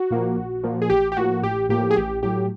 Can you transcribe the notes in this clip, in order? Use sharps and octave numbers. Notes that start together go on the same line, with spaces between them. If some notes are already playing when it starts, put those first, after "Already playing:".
Already playing: F#4
A#2 F3 A#3
A#1
A#2 F3 A#3
G#4
A1 G4
G4
A2 F3 A#3 F#4
A1 G4
A2 F3 A#3 G4
G#4
A1 G4
A2 F#3 G4